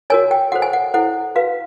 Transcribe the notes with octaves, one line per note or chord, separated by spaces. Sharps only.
F#4 A#4 C#5 G#5
G5
F#4 A4 C5 F#5
G#5
F#5
E4 A4 C5 F#5
F#4 B4 F5